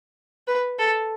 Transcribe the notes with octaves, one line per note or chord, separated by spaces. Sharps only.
B4
A4